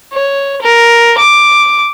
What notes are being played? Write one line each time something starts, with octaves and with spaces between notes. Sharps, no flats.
C#5
A#4
D6